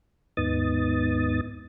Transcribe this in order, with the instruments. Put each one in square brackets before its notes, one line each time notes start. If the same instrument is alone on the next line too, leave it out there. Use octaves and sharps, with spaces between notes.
[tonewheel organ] D#2 G#2 B3 D#4 D#6 A6